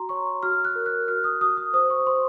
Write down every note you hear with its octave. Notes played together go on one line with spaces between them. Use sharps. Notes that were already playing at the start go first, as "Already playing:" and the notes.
Already playing: F#4 A#5 C6
C#5 C#6
F#4 F6
F#6
A#4
F#6
F#4 F6
D#6
F#4 D#6
D#6
C5 D#6
C#6
C5 C6